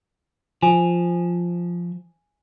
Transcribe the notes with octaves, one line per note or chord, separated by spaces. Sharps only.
F3 G#5